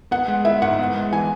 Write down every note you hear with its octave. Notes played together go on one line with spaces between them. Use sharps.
B3 F#5
G#3
E4 E5
G#2 F#5
B3
G#3
E3 G#5